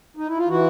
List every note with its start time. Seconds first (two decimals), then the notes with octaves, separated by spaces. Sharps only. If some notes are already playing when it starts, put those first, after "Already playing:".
0.17 D#4
0.27 E4
0.38 F4
0.48 E3 F#4